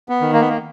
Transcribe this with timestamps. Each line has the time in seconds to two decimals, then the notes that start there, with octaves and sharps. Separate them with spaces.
0.09 B3
0.21 D#3
0.33 A#3
0.41 B3
0.49 A#3